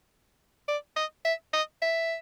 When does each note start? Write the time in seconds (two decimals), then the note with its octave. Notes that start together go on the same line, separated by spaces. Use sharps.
0.68 D5
0.96 D#5
1.25 E5
1.53 D#5
1.82 E5